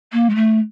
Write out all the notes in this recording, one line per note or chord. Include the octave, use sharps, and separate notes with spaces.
A#3
G#3
A3